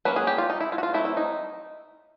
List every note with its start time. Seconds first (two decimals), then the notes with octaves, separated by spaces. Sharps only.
0.05 F#3 A#3 C#4 B4
0.16 G#4
0.27 G4
0.38 F4
0.50 D#4
0.61 E4
0.72 F4
0.78 F#4
0.83 F4
0.93 F#3 A3 C4 D#4 E4
1.05 E4
1.17 D#4